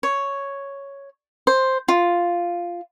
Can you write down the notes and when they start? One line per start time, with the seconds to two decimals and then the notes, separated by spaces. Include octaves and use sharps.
0.03 C#5
1.47 C5
1.88 F4